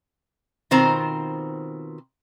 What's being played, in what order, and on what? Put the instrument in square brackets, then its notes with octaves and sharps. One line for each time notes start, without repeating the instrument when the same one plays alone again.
[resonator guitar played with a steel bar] B2 D#3 C4 F4 C5 A#5